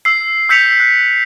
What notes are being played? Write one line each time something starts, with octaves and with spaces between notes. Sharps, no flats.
E6 C7
E6 G6 B6 C#7 F7
F#6